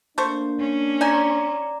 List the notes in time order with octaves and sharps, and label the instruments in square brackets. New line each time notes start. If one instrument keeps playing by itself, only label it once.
[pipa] A3 C5 C#6 [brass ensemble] A#3 D4
[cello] C#4
[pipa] D#4 G#5 [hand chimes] D5 A#5